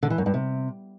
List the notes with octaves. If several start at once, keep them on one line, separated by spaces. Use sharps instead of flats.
D3
E3
F#2
G2
C3